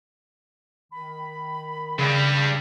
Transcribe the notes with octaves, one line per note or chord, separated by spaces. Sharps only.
D#3 B5
G2 C#3 G3